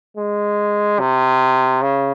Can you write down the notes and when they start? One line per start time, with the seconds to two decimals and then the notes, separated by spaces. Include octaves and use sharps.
0.17 G#3
0.99 C3
1.82 C#3